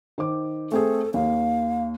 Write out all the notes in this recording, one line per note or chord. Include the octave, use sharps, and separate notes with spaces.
D#3 C5 D6
A3 C4 G#4 A4
D#2 F5